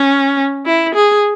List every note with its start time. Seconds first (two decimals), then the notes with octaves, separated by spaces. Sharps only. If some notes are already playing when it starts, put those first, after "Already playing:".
Already playing: C#4
0.66 E4
0.95 G#4